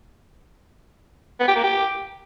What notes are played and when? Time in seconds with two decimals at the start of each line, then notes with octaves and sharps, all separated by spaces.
1.40 B3
1.48 G4
1.56 A#3
1.64 G4